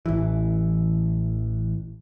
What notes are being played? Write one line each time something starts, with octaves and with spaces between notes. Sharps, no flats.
A1 E3